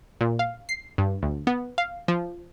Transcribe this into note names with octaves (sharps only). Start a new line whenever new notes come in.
A#2
F5
C7
G2
D2
B3
F5
F3